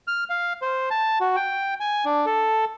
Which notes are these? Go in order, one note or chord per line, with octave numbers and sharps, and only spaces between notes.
F6
F5
C5
A5
F#4
G5
G#5
D4
A4